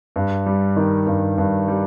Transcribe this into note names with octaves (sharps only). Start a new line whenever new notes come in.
G2
G3
D#3
G2
G2
G3